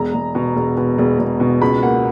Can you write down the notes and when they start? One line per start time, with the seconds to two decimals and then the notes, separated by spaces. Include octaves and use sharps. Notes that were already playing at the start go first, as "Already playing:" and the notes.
Already playing: E1 A#5
0.14 E1
0.35 B2
0.56 E1
0.77 B2
0.98 E1
1.19 E1
1.40 B2
1.61 C#2 B5
1.82 A#3 F#5